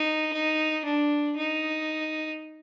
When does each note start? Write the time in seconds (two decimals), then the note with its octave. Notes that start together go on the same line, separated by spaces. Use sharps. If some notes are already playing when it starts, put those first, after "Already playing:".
Already playing: D#4
0.33 D#4
0.85 D4
1.37 D#4